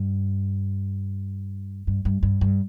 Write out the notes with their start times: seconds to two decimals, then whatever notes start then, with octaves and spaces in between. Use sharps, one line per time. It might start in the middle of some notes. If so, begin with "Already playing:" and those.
Already playing: G2
1.87 G2
2.05 G2
2.23 G2
2.41 G2